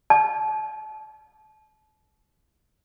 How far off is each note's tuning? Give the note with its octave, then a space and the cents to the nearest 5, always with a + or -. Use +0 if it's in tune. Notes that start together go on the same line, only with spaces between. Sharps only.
A5 -35